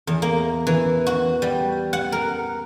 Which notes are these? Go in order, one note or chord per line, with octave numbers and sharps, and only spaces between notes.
E2
A#3
E3
F#4
G3
F#5
A#4